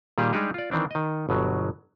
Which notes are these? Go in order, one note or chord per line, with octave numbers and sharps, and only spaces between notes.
A#2 D#3 G3 G4 G#4
G3 G#3 D4 D#4 G4 G#4
F4 D5
D#3 E3 C4 D4
D#3 D#5
G1 B2 F#3